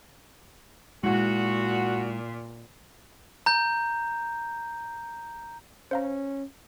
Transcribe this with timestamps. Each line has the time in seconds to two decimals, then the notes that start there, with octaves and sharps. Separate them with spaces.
1.03 A#2 G#3 E4 F#4 F#5
3.46 A#5 G6
5.91 C#4 C5 F5 A#5